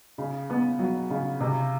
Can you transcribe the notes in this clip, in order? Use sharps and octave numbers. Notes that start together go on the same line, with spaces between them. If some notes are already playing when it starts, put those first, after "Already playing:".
C#3
B3
F#3
C#3
C3